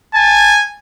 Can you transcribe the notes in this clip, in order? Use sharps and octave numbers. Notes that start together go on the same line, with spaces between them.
G#5 A5